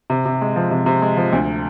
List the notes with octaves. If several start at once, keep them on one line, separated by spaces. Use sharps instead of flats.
C3
C3
G#3
F3
C3
C3
G#3
F3
D2